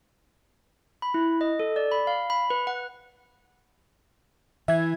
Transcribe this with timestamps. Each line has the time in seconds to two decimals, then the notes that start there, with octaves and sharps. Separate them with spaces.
1.02 B5
1.14 E4
1.41 D#5
1.60 A4
1.76 D5
1.92 B5
2.07 F5
2.30 B5
2.50 B4
2.67 F#5
4.68 E3 E5 G#6